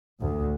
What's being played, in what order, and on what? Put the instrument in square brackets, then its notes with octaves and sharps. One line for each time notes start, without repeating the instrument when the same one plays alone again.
[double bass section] D2